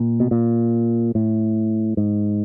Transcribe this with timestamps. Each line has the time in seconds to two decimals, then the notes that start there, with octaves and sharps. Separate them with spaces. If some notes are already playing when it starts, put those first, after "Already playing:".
Already playing: A#2
0.20 B2
0.31 A#2
1.15 A2
1.97 G#2